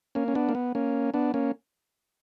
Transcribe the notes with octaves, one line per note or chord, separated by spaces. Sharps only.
A#3 C#4
C#4
B3 D4
A#3
B3
A#3 C#4
B3 D4
A#3 C#4